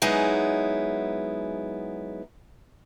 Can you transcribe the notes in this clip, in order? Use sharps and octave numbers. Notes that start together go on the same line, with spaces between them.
F#3 G#3 B3 D#4 E4 G#4